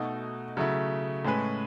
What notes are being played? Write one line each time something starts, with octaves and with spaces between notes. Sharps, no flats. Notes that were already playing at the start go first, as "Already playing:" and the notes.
Already playing: B2 A3 D#4 F#4
C#3 F#3 A3 E4
A2 G#3 C#4 G#4 B4